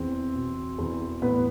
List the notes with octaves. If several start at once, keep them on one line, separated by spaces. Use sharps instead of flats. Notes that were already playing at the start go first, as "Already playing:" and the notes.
Already playing: E2 C4
B2
E2
A2 B3 B4